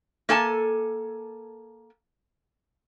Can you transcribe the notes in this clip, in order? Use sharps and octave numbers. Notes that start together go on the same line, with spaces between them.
A#3 A4 G#5 A5